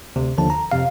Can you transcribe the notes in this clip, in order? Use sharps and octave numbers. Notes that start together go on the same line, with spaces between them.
D2 C3
D#2 D3 F3 A5
A#5
F2 C3 F5